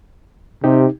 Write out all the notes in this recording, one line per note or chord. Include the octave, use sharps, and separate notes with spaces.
C3 D#4 G4